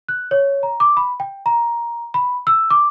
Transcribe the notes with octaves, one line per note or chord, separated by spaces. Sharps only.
F#6
C#5
A#5
D6
B5
G5
A#5
B5
E6
D6